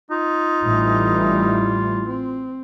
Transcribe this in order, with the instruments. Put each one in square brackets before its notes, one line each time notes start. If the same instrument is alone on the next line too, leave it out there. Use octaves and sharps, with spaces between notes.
[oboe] D#4 [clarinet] F4
[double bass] A1 G3 [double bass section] A2 E3
[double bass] C4